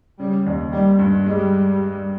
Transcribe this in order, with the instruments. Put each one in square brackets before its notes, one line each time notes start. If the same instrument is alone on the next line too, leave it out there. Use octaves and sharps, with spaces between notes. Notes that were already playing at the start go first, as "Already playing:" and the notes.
[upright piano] C#3 [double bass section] G3
[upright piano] D#2
[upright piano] D#3 [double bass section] G3
[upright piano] G2
[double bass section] G3 [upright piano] G#3